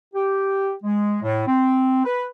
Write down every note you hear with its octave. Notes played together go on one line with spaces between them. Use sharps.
G4
G#3
A2
C4
B4